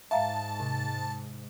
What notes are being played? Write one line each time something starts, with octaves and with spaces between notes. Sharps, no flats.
G#2 E5 F5 A5 A#5
C3